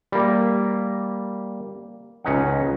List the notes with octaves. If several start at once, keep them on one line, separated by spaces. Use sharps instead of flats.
G3 A#3
C#2 C#4 D#4 F#5